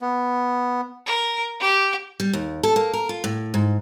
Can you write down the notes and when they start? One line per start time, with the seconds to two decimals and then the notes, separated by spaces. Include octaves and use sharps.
0.01 B3
1.07 A#4
1.61 G4
2.20 G3
2.33 D#2
2.63 A4
2.76 A#3
2.93 A#4
3.09 F4
3.24 A2
3.54 G#2